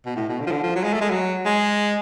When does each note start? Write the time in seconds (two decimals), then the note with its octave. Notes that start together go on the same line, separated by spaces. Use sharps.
0.05 B2
0.16 A2
0.29 B2
0.40 D3
0.47 F3
0.51 D3
0.63 F3
0.76 F#3
0.84 G#3
0.93 A3
1.01 G#3
1.11 F#3
1.45 G#3